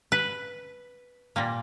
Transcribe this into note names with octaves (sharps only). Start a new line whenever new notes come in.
B4
A#2 G3 A#3